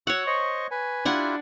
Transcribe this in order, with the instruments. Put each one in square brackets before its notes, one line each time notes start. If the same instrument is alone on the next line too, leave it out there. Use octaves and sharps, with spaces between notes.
[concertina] F#4 E6 [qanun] C#5 F#5
[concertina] C5 D#5 C#6
B4 G#5
[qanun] D4 F#5 G#5 [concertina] E4 F4 G4